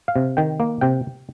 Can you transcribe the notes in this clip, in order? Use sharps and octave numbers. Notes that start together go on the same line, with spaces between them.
F5
C3
D#3 G5
A#3
C3 G5